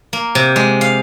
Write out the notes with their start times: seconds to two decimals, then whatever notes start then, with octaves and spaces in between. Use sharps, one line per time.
0.13 A#3
0.35 C3
0.56 G#3
0.81 F5